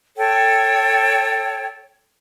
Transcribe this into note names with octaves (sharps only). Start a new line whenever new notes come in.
A4 C#5 G5